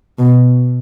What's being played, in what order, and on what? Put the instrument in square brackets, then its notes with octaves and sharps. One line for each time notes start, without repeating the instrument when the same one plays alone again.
[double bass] B2